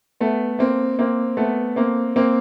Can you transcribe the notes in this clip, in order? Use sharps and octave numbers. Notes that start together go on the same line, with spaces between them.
A3 B3
A#3 C4
A#3 C4
A3 B3
A#3 C4
A#3 C4